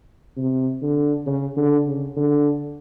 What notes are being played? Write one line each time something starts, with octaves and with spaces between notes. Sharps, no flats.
C3
D3
C#3
D3
C#3
D3